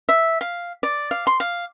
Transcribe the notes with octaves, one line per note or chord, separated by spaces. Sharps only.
E5
F5
D5
F5
C6
F5